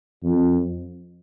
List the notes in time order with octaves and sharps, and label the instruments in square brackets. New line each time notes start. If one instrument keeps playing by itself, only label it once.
[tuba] F2